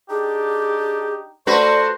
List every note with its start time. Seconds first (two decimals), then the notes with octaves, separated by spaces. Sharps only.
0.10 D4 D#4 G4 G#4
1.47 A3 F#4 B4 C5 D5